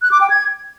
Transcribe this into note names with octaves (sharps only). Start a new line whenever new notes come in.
F#6
D6
G5
G#6